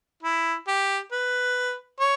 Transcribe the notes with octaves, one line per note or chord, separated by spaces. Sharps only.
E4
G4
B4
C#5